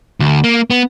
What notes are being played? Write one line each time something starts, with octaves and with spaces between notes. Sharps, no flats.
D2
A#3
B3